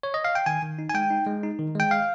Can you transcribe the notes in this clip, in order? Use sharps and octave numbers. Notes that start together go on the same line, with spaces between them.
C#5
D#5
F5
G5
D#3 G#5
D#3
D#4
G#5
G#3 G5
D#4
G#3
D#4
D#3
G#3 G5
F5